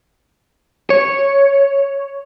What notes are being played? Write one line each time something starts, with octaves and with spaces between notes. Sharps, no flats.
C#5